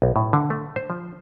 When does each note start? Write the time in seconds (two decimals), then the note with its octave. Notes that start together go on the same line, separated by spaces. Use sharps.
0.02 B1
0.16 A2
0.33 D3
0.50 A3
0.76 C5
0.90 F3